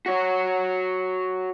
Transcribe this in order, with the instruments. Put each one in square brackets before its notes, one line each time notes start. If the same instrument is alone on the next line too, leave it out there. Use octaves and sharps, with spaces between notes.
[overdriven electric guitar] F#4 C#5